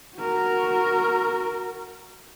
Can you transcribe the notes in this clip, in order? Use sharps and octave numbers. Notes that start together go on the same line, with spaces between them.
F#4 A#4